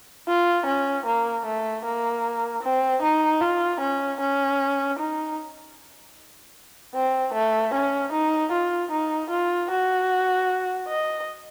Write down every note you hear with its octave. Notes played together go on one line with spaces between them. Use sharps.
F4
C#4
A#3
A3
A#3
C4
D#4
F4
C#4
C#4
D#4
C4
A3
C#4
D#4
F4
D#4
F4
F#4
D#5